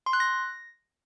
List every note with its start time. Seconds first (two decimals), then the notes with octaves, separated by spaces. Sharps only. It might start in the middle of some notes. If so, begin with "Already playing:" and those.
0.06 C6
0.13 F#6
0.20 A#6